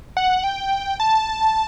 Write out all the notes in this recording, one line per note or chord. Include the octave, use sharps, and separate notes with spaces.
F#5
G5
A5